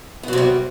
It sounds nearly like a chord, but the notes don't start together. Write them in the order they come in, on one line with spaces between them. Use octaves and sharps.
B3 F#3 C3 G3